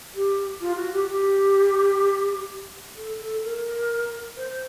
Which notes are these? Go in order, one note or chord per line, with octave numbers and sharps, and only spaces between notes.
G4
F4
F#4
G4
G4
A4
A4
A#4
C5